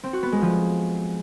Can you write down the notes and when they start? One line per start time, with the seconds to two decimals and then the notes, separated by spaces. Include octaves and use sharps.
0.04 C4
0.13 F#4
0.23 B3
0.32 G#3
0.42 F3